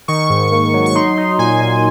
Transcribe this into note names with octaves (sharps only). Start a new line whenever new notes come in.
D#3 C#6
G#2
A#3
F#3
C#6
D#4 C6
D#4
A#2 G#5
A#2